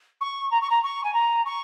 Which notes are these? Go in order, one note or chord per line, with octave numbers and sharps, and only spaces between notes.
C#6
A#5
C#6
A#5
C#6
G#5
A#5
C#6